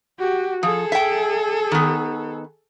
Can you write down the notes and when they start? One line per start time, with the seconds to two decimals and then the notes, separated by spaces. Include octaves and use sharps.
0.19 F#4 G4
0.63 F3 G#4 A4
0.92 E5 G5
1.72 D#3 B3